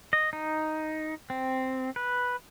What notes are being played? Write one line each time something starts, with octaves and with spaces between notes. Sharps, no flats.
D#5
D#4
C4
B4